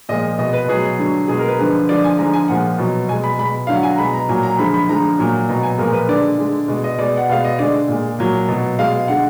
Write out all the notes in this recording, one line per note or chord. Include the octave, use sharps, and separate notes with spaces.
A#2 F3 G#3 D#5
B2 G#3 D#5
B4
B2 F#3 G#4
D3 F#3
B2 G#3 G#4
A#4
B4
D3 F3 G#3
D3 F3 G#3 D5
G#5
D3 F3 G#3 A#5
G#5
A#2 F3 G#3 F#5
B2 F#3
B2 G#3 G#5
B5
B2 G#3 B5
D3 F#3 F5
F#5
G#5
A#5
B2 G#3 B5
A#5
A#2 F#3 G#5
A#5
D3 F3 G#3 B5
B5
D3 F3 G#3 A#5
A#2 F#3
B2 F#3 A#5
G#5
A#2 F3 G#3 A#4
B4
D3 G#3 D5
D3 G#3
B2 G#3
D#5
B2 G#3 D5
F#5
B2 G#3 F5
D#5
D3 G#3 D5
A#2 G#3
A#2 F#3
B2 F#3
B2 G#3 F5
D3 G#3 F#5